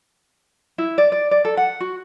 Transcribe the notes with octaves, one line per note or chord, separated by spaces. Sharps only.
E4
D5
D5
D5
A4
F#5
F#4